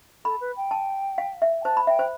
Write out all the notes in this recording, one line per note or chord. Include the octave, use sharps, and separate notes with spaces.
A4 B5
B4
G5
A5
F5
E5
G5
C5 A5
B5
E5 G5
C5